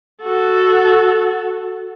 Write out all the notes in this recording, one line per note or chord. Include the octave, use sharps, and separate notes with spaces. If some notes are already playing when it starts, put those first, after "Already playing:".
F#4 A4